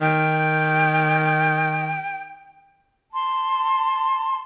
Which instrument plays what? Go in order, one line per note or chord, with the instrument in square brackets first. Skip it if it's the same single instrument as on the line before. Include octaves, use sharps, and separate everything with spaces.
[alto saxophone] D#3 [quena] G5
[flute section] A5 C6